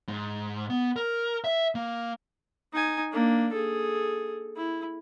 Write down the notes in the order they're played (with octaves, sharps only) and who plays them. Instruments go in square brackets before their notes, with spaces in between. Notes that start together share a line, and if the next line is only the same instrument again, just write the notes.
[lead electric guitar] G#2
B3
A#4
E5
A#3
[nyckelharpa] D#4 G#5
A#3 D4
G#4 A4
E4